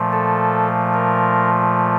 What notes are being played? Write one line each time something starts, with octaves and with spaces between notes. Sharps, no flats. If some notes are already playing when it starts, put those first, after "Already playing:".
Already playing: A#2 F3 A3
A4
A#4